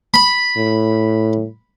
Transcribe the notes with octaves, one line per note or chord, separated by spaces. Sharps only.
B5
A2